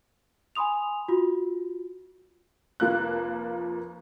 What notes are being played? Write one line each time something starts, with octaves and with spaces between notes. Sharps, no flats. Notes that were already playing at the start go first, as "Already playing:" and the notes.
G#5 B5 C6 D#6 F7
F4 F#4
F1 F3 A#3 F#6